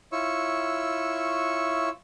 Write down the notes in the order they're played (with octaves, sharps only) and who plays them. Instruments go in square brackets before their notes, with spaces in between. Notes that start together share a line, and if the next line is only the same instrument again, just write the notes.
[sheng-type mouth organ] E4 F4 C#5 C#6 E6